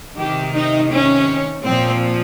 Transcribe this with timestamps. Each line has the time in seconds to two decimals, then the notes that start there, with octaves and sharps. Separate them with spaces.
0.17 C3 D#3 G4
0.54 D#4
0.91 C#4
1.65 A#2 F3 C4